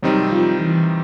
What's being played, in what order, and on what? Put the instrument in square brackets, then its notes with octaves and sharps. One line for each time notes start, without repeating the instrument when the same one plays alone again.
[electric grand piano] C3 D#3 G3 C4 D#4 [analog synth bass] F#3
[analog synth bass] F3
E3